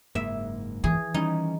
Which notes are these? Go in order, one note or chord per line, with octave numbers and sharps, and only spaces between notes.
F#1 G#2 A#3 E5
E3 G#4
D#3 G3 C#4 D#4